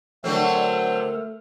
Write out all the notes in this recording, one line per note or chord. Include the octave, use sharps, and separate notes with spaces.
D3 F#3 A3 C4 A4 A#4